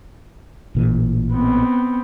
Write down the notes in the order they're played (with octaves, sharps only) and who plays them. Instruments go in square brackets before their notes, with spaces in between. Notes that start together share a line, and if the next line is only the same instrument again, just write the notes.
[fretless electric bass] A1 A#2 E3
[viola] B3 C4